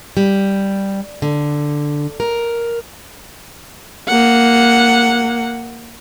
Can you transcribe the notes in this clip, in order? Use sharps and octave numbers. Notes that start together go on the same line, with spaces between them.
G3
D3
A#4
A#3 F#5